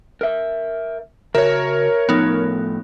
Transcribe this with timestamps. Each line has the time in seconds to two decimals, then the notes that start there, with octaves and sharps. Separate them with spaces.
0.21 A#4 E5
1.35 C#3 F#4 A#4 C#5 E5
2.09 A2 F3 A3 B3 D#4